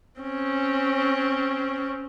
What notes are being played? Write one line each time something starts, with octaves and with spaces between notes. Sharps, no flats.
C4 C#4